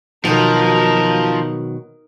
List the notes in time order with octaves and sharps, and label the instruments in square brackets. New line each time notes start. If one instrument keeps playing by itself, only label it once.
[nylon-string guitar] B2 D#3 F#3 [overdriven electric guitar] F3 [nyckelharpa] D#4 A#4